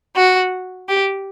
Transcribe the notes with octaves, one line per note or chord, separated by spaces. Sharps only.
F#4
G4